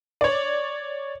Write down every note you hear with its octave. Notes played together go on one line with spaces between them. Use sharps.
C#5 D5